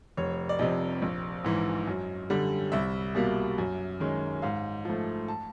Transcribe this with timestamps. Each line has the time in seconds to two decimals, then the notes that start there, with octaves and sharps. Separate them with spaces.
0.17 F1 C#5
0.49 D5
0.59 F2 C3 D#5
1.02 A#1
1.44 G#2 E3
1.87 F#2
2.30 D3 G3
2.72 C2 E5
3.15 B2 G3 A#3
3.58 F#2
4.00 D#3 G#3 C#4
4.42 G#2 F5
4.85 F3 A3
5.28 A5